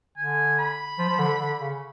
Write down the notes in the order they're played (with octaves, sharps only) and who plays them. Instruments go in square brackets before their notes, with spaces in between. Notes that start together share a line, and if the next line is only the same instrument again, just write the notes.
[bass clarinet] D3 [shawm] G#5
[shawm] B5
[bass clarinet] F3
F3
D3
D3
C#3